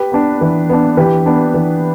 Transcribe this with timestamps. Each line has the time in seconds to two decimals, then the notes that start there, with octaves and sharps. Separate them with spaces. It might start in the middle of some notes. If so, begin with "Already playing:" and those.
Already playing: G4 B4
0.12 B3 D4
0.41 E3
0.69 B3 D4
0.97 E3 G4 B4
1.26 B3 D4
1.54 E3